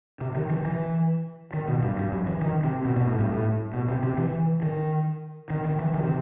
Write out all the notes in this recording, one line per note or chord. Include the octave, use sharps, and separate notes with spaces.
C3
D#3
E3
E3
D#3
B2
G2
G2
F#2
E3
D#3
C3
B2
B2
A2
G2
A2
B2
C3
C3
E3
D#3
D#3
D#3
E3
D#3
C3